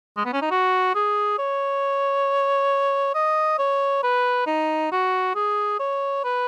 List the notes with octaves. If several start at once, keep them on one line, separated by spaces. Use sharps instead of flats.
G#3
B3
C#4
D#4
F#4
G#4
C#5
D#5
C#5
B4
D#4
F#4
G#4
C#5
B4